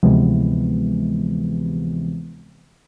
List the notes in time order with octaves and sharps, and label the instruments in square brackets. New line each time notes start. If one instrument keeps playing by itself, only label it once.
[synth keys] D2 C3 E3 F3 G#3 B3